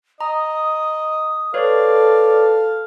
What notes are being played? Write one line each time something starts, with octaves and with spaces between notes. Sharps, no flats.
D#5 A#5 D#6
A4 B4 C#5 D5 F5